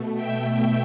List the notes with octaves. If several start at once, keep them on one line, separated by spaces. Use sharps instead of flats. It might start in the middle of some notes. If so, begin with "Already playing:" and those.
Already playing: B2 A3
E5 G5